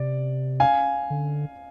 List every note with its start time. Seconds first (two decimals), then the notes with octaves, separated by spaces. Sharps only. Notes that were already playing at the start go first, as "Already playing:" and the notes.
Already playing: C3 D5
0.60 F5 G#5
1.10 D3